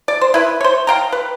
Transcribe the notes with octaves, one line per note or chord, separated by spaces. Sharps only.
D5
C5
E4 B4
C5 C#5
F5 G5 A#5
B4